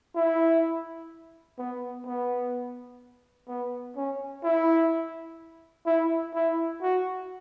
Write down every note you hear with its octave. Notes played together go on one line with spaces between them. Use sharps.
E4
B3
B3
B3
C#4
E4
E4
E4
F#4